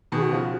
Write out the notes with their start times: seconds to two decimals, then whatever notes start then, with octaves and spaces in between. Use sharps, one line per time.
0.12 B2 D#3 G#4
0.22 F#4
0.32 C#3 F3